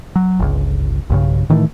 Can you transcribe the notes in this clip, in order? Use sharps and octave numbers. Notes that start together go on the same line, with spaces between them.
F#3
G1 C#2
B1 G2 C#3
A2 D#3 E3 A3